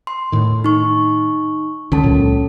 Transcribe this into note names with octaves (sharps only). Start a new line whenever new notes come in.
C6
A2 D#3
D#4 C#6
C#2 D3 C#4 A4 A5
C#2 A#2 F#3